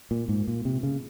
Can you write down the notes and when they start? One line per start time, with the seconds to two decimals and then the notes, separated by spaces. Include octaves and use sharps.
0.11 A#2
0.29 G#2
0.48 A#2
0.65 C3
0.83 C#3